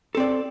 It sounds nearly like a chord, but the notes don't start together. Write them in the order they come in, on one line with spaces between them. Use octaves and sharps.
A4 C4 D5